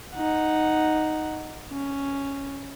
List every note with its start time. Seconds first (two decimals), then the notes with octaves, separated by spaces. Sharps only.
0.15 D#4 F#5
1.71 C#4